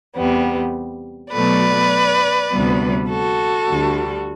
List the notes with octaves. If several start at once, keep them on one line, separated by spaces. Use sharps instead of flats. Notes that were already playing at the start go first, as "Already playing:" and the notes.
E2 C3 G3 B3
B2 F#3 A3 B4 D5
D2 C3 G3 B3
F#4 A4
D2 D3 G3